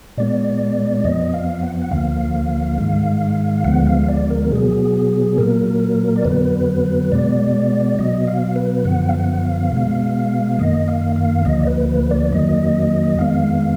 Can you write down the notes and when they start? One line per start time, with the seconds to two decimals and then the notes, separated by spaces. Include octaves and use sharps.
0.18 A#2 G#3 B3 D5
1.04 F2 F3 B3 D#5
1.34 F5
1.63 F#5
1.82 F#5
1.91 D2 D3 F3 A#3 F5
2.78 G#2 D#3 G#3
3.64 D2 D3 F3 G#3 B3 F#5
3.86 F5
4.08 D5
4.30 A#4
4.52 B2 F#3 B3 G#4
5.38 A#2 F#3 A#3 A#4
6.16 D5
6.25 F2 D3 F#3 B3 B4
7.12 B2 G#3 B3 D5
7.99 B2 F#3 B3 D#5
8.27 F5
8.56 B4
8.85 F#2 D3 F3 B3 F#5
9.09 F5
9.15 F#5
9.43 F5
9.72 B2 G#3 B3
10.59 F#2 D#3 A#3 D#5
10.88 F5
11.16 F5
11.45 D2 D3 F3 A#3 D#5
11.60 D5
11.67 B4
11.89 B4
12.11 D5
12.33 F2 D#3 F#3 A#3 D#5
13.18 F2 D#3 G#3 B3 F5